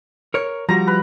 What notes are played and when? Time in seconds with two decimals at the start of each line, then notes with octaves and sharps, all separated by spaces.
0.34 A#4 C#5
0.69 F3 G3 F#4 A#5
0.87 B4